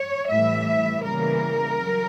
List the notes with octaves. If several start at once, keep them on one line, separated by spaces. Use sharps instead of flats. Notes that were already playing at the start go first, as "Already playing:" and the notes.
Already playing: C#5
A2 E3 G3 E5
C#3 E3 G3 A#3 A#4
C#3 F#3